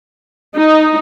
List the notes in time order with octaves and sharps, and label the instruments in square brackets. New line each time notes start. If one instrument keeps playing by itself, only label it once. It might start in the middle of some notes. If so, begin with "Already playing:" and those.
[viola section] D#4